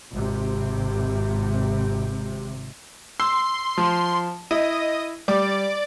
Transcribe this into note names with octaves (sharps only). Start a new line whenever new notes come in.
G#1 C3
C6 E6
F3
E4 D#5
G3 D5 D6